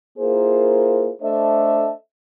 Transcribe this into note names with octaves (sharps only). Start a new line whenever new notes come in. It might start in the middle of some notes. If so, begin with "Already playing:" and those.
A#3 E4 F4 G#4 A#4 C5
A3 D4 A4 C5 D#5 E5